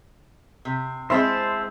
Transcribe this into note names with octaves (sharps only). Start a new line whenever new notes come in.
C3
G#3 C4 E4 C5 E5 A5